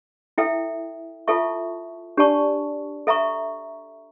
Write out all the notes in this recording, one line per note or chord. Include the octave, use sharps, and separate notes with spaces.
E4 A4 E5 G5
F4 A4 E5 A5 C#6
D4 G4 D5 A5 C#6
A4 E5 A#5 C#6